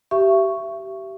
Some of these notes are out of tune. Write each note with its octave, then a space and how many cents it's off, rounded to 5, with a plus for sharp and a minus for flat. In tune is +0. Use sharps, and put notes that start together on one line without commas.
G4 -25 E5 +30 C#6 +0